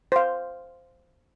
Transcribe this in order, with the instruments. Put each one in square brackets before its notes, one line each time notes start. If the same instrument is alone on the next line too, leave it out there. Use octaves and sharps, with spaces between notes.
[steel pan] C5 F5